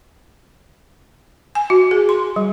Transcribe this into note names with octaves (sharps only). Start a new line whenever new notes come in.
G#5
F#4
G#4
C6
G3